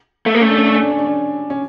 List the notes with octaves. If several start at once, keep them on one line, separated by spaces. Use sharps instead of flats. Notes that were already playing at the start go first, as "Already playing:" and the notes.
A3
A#3
A3 C#4
D4
C#4
D4
C#4
D4
C#4
D4
C#4
C#4